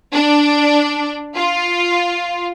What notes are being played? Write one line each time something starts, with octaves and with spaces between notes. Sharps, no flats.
D4
F4